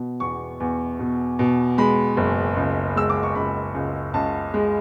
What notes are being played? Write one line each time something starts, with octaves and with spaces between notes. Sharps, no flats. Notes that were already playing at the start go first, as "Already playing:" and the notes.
Already playing: B2
E2 C#6
E2
B2
B2
G#3 B5
F#1
C#2
G#3 E6
D6
C#6
C#2 B5
C#2
C#2 A5
G#3